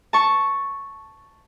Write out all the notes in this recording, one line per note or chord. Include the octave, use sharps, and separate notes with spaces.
A5 C#6